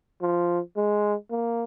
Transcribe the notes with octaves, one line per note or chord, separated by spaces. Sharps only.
F3
G#3
A#3